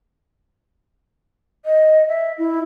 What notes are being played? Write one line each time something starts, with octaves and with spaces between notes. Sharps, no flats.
D#5
E5
E4